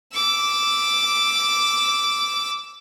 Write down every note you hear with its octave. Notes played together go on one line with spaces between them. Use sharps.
D6 E6